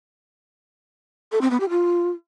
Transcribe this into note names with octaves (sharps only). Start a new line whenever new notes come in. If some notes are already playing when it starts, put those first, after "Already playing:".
A4
C4
B3
G4
F4